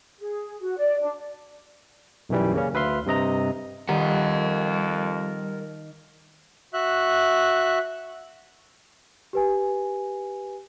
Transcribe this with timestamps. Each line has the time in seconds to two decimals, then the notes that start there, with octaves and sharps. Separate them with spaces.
0.19 G#4
0.61 F#4
0.78 D5
1.02 D4
2.29 B1 F#2 E3 G3
2.53 C#3 A#3 C#4
2.74 D2 B4 E5 F5 C6
3.06 G2 C3 D#5 A#5
3.89 F2 D#3 G3 A#4 F#5
6.73 F#4 E5 F#6
9.33 G4 B4 G#5